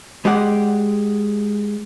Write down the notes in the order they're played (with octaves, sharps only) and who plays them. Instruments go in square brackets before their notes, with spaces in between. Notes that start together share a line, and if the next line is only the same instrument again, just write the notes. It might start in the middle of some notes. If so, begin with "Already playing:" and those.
[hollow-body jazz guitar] G#3 G4 D5 F#5